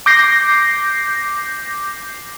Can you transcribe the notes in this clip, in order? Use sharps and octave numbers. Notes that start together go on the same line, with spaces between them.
D6 G6 A#6 C7